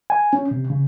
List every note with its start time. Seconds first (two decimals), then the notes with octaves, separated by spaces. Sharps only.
0.10 G#5
0.33 C#4
0.51 C3
0.70 C#3